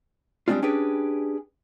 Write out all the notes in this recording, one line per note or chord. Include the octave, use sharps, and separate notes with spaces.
G3 G#3 C4 D4 F4
C#4 D4 G4 G#4 B4